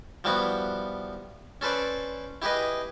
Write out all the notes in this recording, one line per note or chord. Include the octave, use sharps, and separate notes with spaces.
F3 G3 B3 E4 F#4
C#4 A4 B4 C5 D5
E4 G4 G#4 B4 D#5